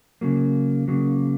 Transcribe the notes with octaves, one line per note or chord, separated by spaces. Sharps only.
C#3 F#3 A#3
C#3 F#3 A#3